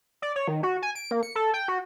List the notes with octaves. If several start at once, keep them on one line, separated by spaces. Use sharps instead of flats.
D5
C#5
D#3
F#4
G#5
D7
A#3
C#7
A4
G5
F#4